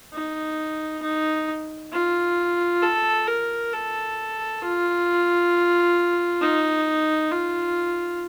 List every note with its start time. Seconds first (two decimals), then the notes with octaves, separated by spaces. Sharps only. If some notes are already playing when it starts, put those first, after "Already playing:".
0.13 D#4
1.02 D#4
1.92 F4
2.82 A4
3.27 A#4
3.72 A4
4.62 F4
6.42 D#4
7.32 F4